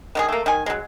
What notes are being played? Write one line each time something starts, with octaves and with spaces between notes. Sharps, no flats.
D#3 G4 G#4
A3 A#3
D#3 G#5
F#3 G#3